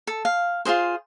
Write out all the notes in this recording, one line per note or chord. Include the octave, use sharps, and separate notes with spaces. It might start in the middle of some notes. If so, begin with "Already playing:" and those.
A4
F5
F4 F#4 G#4 C5